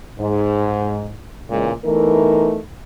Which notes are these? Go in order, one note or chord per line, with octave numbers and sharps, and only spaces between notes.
G#2
E2 A#2 C#3 G#3
E2 E3 A3 D#4 A#4